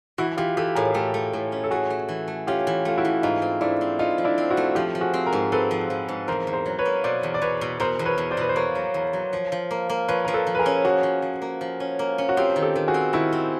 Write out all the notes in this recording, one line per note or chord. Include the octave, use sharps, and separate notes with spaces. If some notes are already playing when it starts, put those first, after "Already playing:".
E3 E4 F#4
E3 F4 G4
E3 G4 A4
A2 G#4 A#4
A3 G4 A4
A3
A2
C#4
A4
A3 F#4 G#4
A3
E3
A3
C#4 F4 G4
E3
A3 F4
E4 F#4
E3
G#2 D#4 F4
C4
A3 D4 E4
C4
A3 D#4 F4
F3
D4 E4
C4
E4 F#4
A3
F3 F4 G4
F3
F#4 G#4
C4
G#4 A#4
G#2
C4 A4 B4
F3
F3
G#2
E2 A#4 C5
E2
A#4 C5
F#3
B4 C#5
A#3
B2 C5 D5
E2
D5
E2 B4 C#5
B2
B2 A#4 C5
E2
B4 C#5
E2
C5 D5
B2 B4
C5
A#3 B4 C#5
F#3
E2
F#3
F3
F3
A#3
A#3
F3 B4 C#5
F3 A#4
A4 B4
F3
B4
G#4 A#4
C#4
A#3 F#4 G#4
F3
F3
A#3
F3
C#4
A#3
C#4
F#4
C4 F4 G4
D#3
G4 A4
D#3
F#4 G#4
C4
D#3 E4 F#4
C4